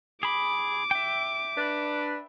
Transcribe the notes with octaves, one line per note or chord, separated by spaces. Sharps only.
G#4 B5 D6
E5 G5
D4 B4